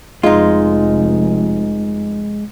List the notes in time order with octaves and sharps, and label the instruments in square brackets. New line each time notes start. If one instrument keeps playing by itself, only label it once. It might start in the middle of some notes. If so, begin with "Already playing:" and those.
[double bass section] F1 [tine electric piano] G#3 [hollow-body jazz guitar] D#4 F4